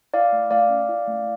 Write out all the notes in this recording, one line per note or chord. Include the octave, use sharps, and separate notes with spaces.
E4 D5 F5
A3
A3 D5 F5
C#4
E4
A3